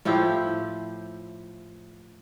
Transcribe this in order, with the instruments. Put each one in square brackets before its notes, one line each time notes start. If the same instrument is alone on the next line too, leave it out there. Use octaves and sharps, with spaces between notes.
[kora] A2 F3 E4 G4